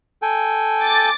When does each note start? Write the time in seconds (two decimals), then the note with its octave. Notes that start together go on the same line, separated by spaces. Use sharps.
0.22 A4 G5 G#5
0.81 D6 A6